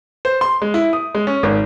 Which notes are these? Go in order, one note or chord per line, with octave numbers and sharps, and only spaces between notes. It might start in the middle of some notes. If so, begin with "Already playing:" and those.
C5
C6
G#3
E4
D#6
G#3
C#4
G#1